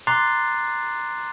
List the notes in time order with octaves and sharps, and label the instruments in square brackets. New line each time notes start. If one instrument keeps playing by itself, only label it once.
[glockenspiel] A#5 C6 D6 F#6 A6 C7